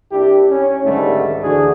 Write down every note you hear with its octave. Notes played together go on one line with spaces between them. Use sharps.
C2 D4 E4 G4
C#4
C2 G#2 D3 D#3 G3 A3
D2 D3 E3 D4 F#4 G#4